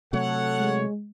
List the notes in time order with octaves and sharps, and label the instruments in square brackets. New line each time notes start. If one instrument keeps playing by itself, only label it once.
[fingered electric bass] C3 F#3 A3 [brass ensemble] A4 F#5 [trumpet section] C#5
[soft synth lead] G#3